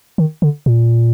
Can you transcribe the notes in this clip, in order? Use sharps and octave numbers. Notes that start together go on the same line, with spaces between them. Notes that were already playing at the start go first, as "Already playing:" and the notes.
D#3
D3
A#2